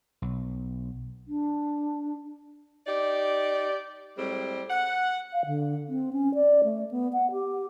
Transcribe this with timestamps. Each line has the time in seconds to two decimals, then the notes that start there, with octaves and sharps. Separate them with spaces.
0.22 B1
1.26 D4
2.87 D#4 G4 D5
4.17 A2 G3 G#3 C4
4.69 F#5
5.32 F5
5.46 D3
5.89 C4
6.13 C#4
6.35 D5
6.64 A3
6.91 B3
7.13 F#5
7.32 G4